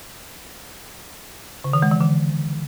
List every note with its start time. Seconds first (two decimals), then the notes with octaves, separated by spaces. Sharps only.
1.64 C#3
1.73 D#3
1.82 G#3
1.91 E3
2.00 D3